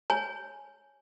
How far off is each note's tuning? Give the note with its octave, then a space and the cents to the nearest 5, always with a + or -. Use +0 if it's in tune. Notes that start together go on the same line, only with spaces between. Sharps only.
C#5 +0 G#5 +0